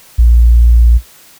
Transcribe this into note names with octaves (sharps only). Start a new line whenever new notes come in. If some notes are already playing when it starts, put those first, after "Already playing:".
A#1